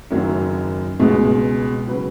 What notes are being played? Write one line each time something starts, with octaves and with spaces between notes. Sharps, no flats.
F#1 F#2 D#3 F#3 C#5
C#2 B2 G#3
C#3 F#3 B4